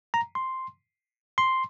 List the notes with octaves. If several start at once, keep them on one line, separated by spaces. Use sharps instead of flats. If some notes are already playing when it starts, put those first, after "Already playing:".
A#5
C6
C6